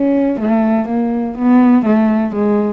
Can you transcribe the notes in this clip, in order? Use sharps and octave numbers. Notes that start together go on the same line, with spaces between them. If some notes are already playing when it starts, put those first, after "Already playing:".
Already playing: C#4
A3
A#3
B3
A3
G#3